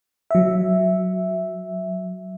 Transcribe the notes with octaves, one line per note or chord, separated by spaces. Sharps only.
F#3 E5